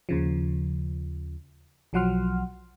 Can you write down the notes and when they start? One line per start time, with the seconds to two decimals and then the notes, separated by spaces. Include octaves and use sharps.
0.09 D#2 C#3 F3
1.93 B1 F3 F#3 F#5 C6 F6